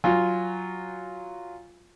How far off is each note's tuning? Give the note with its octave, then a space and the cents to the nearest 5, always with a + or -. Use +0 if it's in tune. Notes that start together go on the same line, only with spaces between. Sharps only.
F#3 +0 F4 +0 G#5 -5